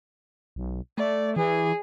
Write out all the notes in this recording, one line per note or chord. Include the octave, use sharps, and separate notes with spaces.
B1
A3 D5
E3 G#4